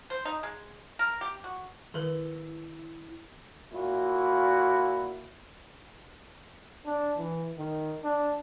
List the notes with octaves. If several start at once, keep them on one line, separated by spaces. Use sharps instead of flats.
C5
D#4
G#3
A#4
G4
F#4
D#3 E4 B4
A#2 E4 F#4
D4
E3
D#3
D4